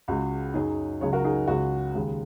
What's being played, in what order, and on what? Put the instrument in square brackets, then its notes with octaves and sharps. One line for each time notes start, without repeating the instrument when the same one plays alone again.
[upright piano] C#2 C#3 G#3 F#4
F#2 F#3 D#4 G#4
C#2 C#3 F#3 G#4 C#5
F#4 A#4
D#4 G#4
C#2 C#3 G#3 F#4
D#2 C#3 G#3